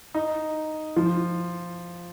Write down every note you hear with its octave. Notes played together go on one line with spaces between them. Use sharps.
D#4
F3